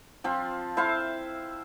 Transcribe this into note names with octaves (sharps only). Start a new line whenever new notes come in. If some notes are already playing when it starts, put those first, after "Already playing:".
F3 C4 F4
E4 C5 E5 F5